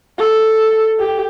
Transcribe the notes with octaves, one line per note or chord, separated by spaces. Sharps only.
A4
G4